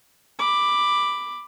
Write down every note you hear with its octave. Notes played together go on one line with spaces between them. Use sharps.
B5 D6